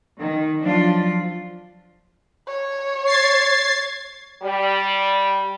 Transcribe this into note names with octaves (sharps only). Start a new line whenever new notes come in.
D#3
F3 F#3 D4 F4
C#5
G#6 A6 C7
G3